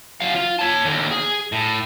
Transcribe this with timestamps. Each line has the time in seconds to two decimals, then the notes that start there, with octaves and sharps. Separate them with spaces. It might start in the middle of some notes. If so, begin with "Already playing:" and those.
0.21 F#3 F5
0.34 F4
0.59 C#5 A5
0.85 D#2 D3
1.11 G#4
1.52 A2